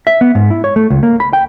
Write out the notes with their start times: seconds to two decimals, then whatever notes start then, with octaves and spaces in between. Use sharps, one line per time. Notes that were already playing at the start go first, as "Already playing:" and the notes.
0.07 E5
0.21 B3
0.35 G#2
0.50 E4
0.64 C#5
0.76 A3
0.90 C#2
1.03 A#3
1.20 B5
1.33 G5